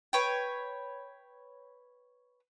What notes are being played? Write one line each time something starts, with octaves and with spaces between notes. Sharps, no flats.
B4 C#5 G5